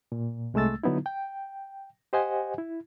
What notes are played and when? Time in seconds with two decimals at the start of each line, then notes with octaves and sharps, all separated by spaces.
0.12 A#2
0.54 C2 G#3 A3 E6 A6
0.83 D3 F#3 B3 D#4 E4
1.06 G5
2.13 G4 C5 D#5 F#5 G#5
2.58 E4